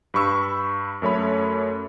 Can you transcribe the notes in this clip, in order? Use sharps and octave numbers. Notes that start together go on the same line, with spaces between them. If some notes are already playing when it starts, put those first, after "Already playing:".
G2 B5 C#6 E6
F#2 A3 C#5 B5